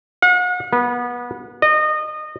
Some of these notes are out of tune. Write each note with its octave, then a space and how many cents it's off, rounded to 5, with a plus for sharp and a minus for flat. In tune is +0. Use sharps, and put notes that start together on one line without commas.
F#5 -40
B3 -25
D#5 -25